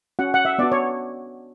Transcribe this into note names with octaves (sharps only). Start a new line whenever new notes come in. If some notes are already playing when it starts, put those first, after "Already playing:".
C#4 F#4 F#5
F#5
E5
B3 D4 F#4 D5
C#5